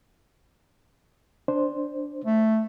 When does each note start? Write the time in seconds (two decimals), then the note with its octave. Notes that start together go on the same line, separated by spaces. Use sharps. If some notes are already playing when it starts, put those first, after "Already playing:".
1.48 D4 C5
2.25 A3